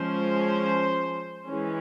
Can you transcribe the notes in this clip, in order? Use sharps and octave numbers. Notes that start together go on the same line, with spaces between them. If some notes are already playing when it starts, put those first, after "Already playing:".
Already playing: F3 G#3 C#4 C5
E3 G#3 C#4